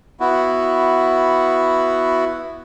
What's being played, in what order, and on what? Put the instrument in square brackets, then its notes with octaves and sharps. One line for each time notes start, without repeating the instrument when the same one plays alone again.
[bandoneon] B3 E4 F#4